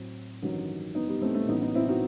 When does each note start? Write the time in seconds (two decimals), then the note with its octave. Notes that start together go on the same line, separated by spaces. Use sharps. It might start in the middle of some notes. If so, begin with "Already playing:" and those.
Already playing: A2 F#3 C4
0.42 A1 G2 D#3 F#3
0.95 B3 D#4
1.09 G3 B3
1.22 A3 C4
1.35 A3 C4
1.48 A1 A2 F#3 B3 D#4
1.61 B3 D#4
1.75 C4 E4
1.88 D#4 F#4